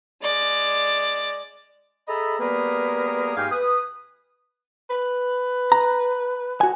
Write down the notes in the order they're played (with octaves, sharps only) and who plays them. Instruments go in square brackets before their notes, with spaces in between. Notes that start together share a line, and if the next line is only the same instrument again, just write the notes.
[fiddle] G#3 D5
[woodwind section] G#4 A4 D#5 E5 A#5 B5
G3 A#3 B3 G#4 A#4 B4
G#2 G4 F5 G5 G#5 F6
B4 D#6
[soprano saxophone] B4
[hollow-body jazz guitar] A#5
F#4 G#5